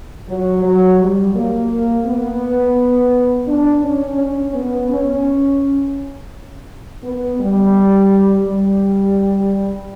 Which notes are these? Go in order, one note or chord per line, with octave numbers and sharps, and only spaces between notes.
F#3
F#3
G3
A#3
B3
D4
C#4
C#4
B3
C#4
B3
G3
G3